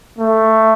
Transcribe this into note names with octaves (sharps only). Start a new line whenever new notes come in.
A3